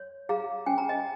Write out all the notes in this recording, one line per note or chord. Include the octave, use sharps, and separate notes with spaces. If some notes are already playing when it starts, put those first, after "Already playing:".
Already playing: C#5
G#4 F5 A#5
C#4 G#5
A#5
D#5 G#5